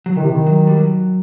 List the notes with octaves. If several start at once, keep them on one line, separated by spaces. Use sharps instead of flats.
F#3
D#3 E3
C3
D#3
F#3
G3
F#3